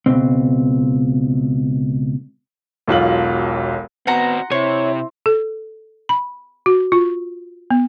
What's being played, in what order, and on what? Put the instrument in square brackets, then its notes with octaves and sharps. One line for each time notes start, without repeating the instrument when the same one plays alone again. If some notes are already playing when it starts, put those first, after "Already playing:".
[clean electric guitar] C#2 B2 C4
[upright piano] E1 B1 F4 F#7
[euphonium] B3 [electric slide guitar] C4 F#4 [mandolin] F#5 A#5 C6
[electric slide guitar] C3 [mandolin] C4 [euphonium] E4 [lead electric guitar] C#5
[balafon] A4
B5
F#4
F4
B3